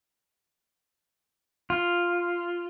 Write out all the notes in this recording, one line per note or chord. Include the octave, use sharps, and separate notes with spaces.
F4